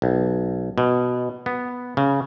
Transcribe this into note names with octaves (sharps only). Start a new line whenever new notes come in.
B1
B2
B3
C#3